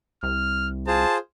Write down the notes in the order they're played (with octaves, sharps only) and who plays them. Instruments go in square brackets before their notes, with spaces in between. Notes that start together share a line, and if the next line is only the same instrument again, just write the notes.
[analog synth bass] C2 [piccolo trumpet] F6
[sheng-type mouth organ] F4 G#4 C5 [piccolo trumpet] A5